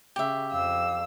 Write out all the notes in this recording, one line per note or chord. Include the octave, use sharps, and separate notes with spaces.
C#3 G4 E5
F2 F5 E6